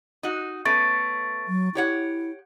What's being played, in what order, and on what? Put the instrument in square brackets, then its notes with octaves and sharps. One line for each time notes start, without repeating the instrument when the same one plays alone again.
[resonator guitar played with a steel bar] D#4 F#4
[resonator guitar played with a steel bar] A3 B3 C#4 [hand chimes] C#6 A6 D7
[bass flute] F#3
[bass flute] E4 [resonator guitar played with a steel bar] G4 C#5 F#5